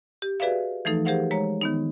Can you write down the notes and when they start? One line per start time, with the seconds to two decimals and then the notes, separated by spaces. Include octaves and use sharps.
0.22 G4
0.40 F#4 G#4 B4 D5 E5 F5
0.85 E3 F3 A3 D#4 A4
1.05 G4 G#4 A#4 C5 F5 F#5
1.31 G#3 C#5 A#5
1.61 D#3 B3 D#4